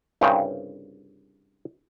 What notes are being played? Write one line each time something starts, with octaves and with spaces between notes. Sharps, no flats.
C2 G2 C#3 F4 G5